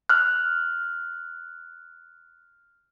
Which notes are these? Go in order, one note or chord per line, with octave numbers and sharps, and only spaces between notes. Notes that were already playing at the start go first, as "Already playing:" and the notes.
F6 F#6